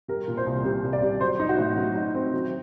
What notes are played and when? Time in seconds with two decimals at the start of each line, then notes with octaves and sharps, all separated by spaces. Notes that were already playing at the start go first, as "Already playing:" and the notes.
0.08 G3 A#4
0.28 A#2
0.37 C5
0.46 C2
0.65 G3 C5
0.84 C2
0.93 D5
1.02 G3
1.21 F#3 C5
1.40 D#4
1.49 F#4
1.59 A2
1.78 F#3
1.96 D#4
2.15 C4
2.33 F#3